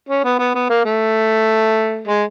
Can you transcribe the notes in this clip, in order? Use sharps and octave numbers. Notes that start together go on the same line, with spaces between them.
C#4
B3
B3
B3
A#3
A3
G#3